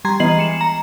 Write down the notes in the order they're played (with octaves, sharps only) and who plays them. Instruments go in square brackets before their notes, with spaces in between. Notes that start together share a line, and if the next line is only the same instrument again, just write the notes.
[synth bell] G3 A#5 C6 G#6
E3 B3 D#5 C7 F#7
G#3 C#7 E7
A#5